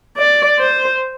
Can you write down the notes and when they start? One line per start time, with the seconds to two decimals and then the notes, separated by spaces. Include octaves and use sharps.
0.17 D5
0.59 C5